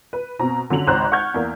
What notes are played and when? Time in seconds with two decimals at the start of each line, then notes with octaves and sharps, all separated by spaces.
0.13 B4
0.39 B2 C4 A#5
0.70 D3 F#3 C#4 F7 F#7
0.87 G#1 C#2 C5 C#5 A#5 F#6
1.12 F#5 C#6 F6 G6 G#6
1.34 E2 A#3